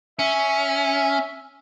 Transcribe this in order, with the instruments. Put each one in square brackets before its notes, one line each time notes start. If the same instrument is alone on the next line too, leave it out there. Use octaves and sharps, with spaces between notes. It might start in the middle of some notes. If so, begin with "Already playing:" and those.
[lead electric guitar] C#4 [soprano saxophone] E5